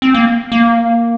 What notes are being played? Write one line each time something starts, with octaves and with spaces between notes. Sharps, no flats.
C4
A#3
A#3